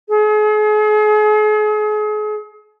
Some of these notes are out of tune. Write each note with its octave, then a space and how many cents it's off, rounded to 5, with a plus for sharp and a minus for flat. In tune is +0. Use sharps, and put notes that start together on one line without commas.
G#4 +40